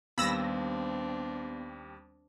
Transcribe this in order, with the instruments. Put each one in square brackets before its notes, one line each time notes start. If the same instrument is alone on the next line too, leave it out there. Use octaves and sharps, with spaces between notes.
[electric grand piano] D#2 G3 [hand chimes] B3 [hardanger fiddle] C4 D4 [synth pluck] B5 E6 A#6